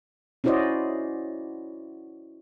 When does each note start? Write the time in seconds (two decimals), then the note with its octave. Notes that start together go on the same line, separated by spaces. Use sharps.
0.44 C#4 E4 F#4 C5 D5 D#5